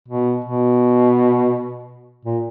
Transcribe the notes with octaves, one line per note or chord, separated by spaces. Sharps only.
B2
B2
A#2